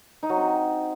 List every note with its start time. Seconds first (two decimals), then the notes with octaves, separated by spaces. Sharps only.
0.23 D#4
0.29 F#3
0.36 C4